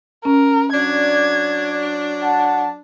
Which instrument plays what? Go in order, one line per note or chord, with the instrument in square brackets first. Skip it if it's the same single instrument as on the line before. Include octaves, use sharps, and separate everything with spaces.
[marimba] C#4 [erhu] A#4
[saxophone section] F#3 D4 [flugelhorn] D5 [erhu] G#6
[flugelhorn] F#5 [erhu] A5